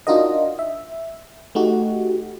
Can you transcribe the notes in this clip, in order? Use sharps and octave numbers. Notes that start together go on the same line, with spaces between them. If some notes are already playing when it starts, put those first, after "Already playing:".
D4 D#4 F4 F#4 A#4 D#5
E5
A3 D#4 F#4 G4